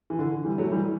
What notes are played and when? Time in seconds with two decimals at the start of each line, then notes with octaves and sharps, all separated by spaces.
0.10 E3
0.19 D3
0.45 E3 G3
0.58 F#3 A3
0.72 E3 G3